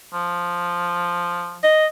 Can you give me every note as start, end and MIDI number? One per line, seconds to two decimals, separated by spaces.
0.13 1.61 53
1.64 1.86 75